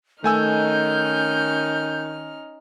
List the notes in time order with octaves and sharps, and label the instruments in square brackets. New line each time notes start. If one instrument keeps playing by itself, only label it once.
[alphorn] D#3 [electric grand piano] A3 G#5 E6 [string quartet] C#4 D#4 F6 [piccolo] G6